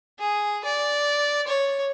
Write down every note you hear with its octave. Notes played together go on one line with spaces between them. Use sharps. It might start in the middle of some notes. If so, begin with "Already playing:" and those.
G#4
D5
C#5